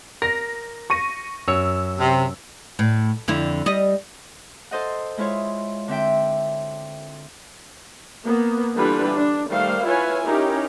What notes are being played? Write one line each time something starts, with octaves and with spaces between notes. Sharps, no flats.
A#4 A#6
C#6 A#6 D#7
F#2 C#5 E6
C3
A2
F2 D3 E4
G3 D#5
A4 C5 D#5 F#5
G#3 E4 F4 C#5
D3 C4 E5 G5
A#3 B3
D3 E3 G3 D4 F4 B4
D4
D#3 G3 A3 C5 F5
E4 F4 B4 C#5 G#5
C#4 D#4 E4 G4 A#4